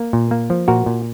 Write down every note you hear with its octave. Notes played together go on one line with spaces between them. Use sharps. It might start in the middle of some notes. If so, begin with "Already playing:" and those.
Already playing: A#3
A#2
A#3
F3
A#2 F#4 A#4
A#2